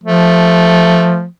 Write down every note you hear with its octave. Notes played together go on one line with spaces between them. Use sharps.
F3 A3